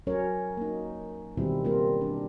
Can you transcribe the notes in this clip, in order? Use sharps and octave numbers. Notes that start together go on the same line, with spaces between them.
F#3 C#4 A#4 C#5
A#3 D#4
B2 D#3 E3 G3 C4 E4
C#3 G3 A#3 C4 F4 A#4
D4